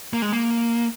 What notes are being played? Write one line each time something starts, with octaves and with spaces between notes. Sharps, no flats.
A#3
G#3
A#3